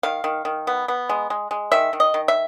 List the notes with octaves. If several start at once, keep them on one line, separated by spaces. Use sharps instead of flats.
D#3 F5
D#3
D#3
B3
B3
G#3
G#3
G#3
D#3 E5
D#3
D#5
D#3
E5